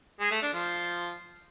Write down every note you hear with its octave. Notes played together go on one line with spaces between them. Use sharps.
G#3
A3
D4
F3